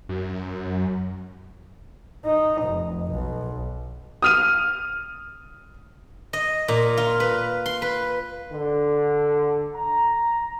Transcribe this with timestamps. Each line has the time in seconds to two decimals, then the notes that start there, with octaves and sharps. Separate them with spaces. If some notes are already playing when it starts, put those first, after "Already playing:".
0.09 F#2
2.25 D#4
2.62 F1
3.11 B1
4.22 D#6 F6 D#7
6.33 D#5
6.68 A#2
6.97 F4
7.20 B4
7.66 C6
7.82 B4
8.51 D3
9.75 A#5